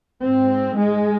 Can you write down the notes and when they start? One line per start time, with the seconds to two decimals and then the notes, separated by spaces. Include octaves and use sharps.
0.21 G#2 C4
0.76 G#3